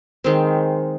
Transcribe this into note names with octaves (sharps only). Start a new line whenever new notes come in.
D#3 G#3 C4